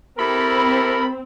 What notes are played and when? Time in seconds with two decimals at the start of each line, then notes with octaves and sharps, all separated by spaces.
0.19 C4 E4 G4 A4 A#4 B5